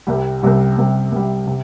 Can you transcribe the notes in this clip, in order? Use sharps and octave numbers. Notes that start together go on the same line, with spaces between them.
C2 C3 G3
C2 C3 G3
C2 C3 G3
C2 C3 G3
C3